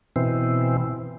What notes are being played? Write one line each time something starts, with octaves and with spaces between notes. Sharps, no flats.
B2 E3 C4